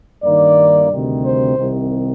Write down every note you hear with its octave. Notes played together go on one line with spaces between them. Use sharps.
G2 D#3 A#3 D#4 D5
D2 C3 D#3 G3
C5
C2 C3 D#3